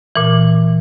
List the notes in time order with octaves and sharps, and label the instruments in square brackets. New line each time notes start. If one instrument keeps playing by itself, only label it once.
[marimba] A#2 E3